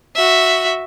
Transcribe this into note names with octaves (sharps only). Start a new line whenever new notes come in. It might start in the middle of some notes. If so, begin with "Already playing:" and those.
F#4 E5